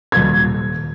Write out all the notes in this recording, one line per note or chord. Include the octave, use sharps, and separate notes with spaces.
D#1 G#6